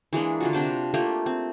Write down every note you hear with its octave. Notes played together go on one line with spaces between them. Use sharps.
E3 G#3 A#3 D4
D3 F4 F#4
C3 D4 C5 D6
A3 A#3 F4 G4
C4